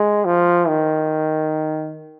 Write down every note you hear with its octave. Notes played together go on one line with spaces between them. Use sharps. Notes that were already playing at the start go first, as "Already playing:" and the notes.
Already playing: G#3
F3
D#3